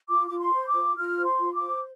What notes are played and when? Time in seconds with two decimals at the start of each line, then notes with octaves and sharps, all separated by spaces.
0.08 F4 D6
0.28 F4 D6
0.39 C6
0.53 C5
0.67 D6
0.74 F4
0.96 F4 F6
1.18 C5
1.24 C6
1.39 F4
1.54 D6
1.62 C5